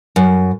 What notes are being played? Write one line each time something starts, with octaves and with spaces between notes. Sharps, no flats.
F#2